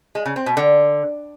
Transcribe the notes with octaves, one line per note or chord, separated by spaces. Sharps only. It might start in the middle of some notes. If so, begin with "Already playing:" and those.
G#3
C#3
C4
B2
D3